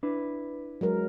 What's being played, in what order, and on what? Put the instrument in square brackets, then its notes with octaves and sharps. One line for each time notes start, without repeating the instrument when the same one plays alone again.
[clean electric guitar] D4 E4 B4
[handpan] F#3 G#3 A#4